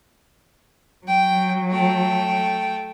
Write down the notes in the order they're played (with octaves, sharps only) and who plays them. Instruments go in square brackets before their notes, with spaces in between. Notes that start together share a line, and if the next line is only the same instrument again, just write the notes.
[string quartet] F#3 [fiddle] G5
[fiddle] A3 G5